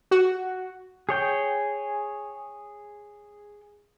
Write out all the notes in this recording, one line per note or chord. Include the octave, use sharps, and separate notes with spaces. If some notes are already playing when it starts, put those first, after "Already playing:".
F#4
G#4 C#5 G5